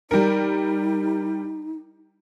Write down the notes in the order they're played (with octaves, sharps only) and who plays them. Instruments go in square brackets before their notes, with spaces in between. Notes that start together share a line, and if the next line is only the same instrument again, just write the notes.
[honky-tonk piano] G3 A#4 [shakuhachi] D#4